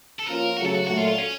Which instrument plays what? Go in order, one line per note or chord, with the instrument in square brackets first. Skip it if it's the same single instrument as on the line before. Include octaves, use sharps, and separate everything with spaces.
[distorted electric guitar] A4
[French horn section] F3 A#3 C#4 F4 [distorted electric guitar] A#4
[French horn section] C#3 F#3 A3 [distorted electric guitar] F#4
[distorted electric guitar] A4
F#4
[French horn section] A#2 F#3 A3 [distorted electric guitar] F#4
[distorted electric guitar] F4
F4
C#4